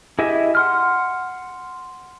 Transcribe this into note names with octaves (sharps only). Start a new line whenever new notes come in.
E4 G4 G#4 D#5 E5
F#5 C6 F6